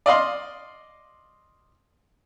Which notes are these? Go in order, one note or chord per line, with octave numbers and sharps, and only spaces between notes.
D5 D#5 F5 C6